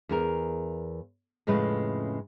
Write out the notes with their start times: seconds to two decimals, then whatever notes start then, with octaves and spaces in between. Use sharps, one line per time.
0.09 E2 G#4 A#4
1.47 F2 A2 C#3 G#3 B4